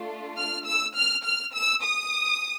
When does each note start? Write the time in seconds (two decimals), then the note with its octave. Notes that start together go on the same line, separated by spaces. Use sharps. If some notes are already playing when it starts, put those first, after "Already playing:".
Already playing: A3 D4 F4
0.37 F6
0.66 E6
0.95 F6
1.24 F6
1.54 E6
1.83 D#6